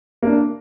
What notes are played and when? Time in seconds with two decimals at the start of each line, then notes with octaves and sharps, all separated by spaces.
0.22 A#3 D4